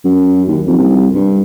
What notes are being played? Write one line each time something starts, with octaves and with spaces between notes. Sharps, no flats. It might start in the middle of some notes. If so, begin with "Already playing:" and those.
F#2
D#2
F2
C2
G2